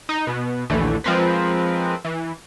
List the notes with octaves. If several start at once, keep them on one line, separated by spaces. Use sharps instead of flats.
D#4
B2 B3
A#1 D#2 D3 E3 A3
F3 G#3 C4 A#4 B4
E3